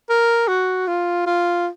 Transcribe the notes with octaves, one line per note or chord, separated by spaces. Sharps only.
A#4
F#4
F4
F4